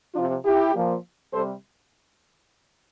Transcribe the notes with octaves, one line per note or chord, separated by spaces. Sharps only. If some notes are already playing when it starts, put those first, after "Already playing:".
C3 F3 D4 F4
E4 G4
A#2 F3
C3 G3 A4 C5